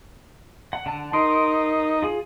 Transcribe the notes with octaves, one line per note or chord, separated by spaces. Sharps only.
F#5
D3 F#5 A5
D#4 A#4 C6
F4 G#4